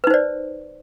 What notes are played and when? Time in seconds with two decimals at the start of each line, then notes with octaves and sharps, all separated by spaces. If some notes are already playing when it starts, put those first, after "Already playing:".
0.04 B4
0.07 D#4
0.10 C5
0.14 D5